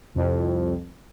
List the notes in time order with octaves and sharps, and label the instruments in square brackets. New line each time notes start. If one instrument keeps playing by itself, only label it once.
[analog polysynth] C2 F2